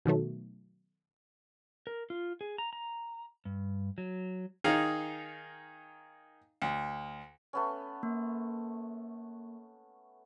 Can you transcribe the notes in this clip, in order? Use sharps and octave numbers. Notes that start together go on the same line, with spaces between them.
B2 D#3 F#3 A3
A#4
F4
G#4
A#5
A#5
G2
F#3
D#3 D#4 G#4 F5
D2
A3 B3 C#4
A#3